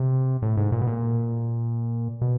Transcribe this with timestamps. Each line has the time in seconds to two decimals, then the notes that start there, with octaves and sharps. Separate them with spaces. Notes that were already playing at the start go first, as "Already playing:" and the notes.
Already playing: C3
0.42 A2
0.57 G#2
0.72 A#2
0.81 B2
0.87 A#2
2.21 B2